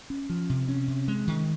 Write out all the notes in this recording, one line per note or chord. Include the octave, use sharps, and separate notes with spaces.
C#4
F3
C3
C#4
C3
G#3
D#3